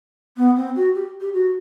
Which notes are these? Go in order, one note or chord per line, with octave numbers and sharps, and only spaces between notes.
B3
C4
F#4
G4
G4
F#4